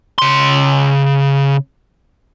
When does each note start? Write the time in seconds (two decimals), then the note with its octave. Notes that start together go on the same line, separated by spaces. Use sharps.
0.18 C#3 C6